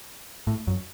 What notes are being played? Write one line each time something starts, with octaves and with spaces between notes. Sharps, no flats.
A2
F#2